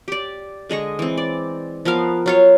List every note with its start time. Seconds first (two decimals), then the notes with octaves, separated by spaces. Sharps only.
0.08 G4 D5
0.69 D3 G#3 D#5 C#6
0.99 E3 C4
1.18 D5
1.85 F3 B3 A#4 F5
2.26 F#3 F4 C#5